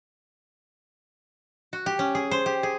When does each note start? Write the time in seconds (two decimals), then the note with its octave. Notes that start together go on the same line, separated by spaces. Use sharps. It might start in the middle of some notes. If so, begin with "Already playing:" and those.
1.73 F#4
1.86 G4
1.99 C#4
2.15 G#4
2.31 C5
2.46 G4
2.63 G#4